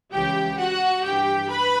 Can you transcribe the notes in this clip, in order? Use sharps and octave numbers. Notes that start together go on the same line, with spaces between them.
C#2 C#3 E3 G4 G5
F#4 F#5
G2 E3 G4 G5
B4 B5